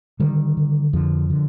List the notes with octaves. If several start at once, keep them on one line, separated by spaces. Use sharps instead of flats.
D3 D#3 G3
D3
F2 D3 F3
D3